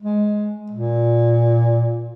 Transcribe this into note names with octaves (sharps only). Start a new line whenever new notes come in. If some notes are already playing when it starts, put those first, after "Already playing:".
G#3
A#2